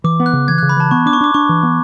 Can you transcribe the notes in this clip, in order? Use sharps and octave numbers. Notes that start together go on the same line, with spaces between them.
E3 D6
B3
F#6
C#3
E3 G#6
F#6
C#3
B5
E3 A5
B3 C#6
D4 D6
C#6
D4 D6
D4 C#6
E3
B3